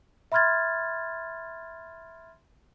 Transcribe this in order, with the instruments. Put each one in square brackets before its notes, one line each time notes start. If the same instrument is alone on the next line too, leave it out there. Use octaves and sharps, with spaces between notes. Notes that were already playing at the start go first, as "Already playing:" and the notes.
[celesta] E5 B5 C6 F6 G#6 A6